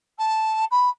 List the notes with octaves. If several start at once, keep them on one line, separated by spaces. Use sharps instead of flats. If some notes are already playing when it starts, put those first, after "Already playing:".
A5
B5